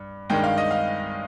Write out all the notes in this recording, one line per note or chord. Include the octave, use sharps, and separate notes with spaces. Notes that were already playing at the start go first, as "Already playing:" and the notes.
Already playing: G2
G2 D#3 G#3 G5
F5
D#5
F5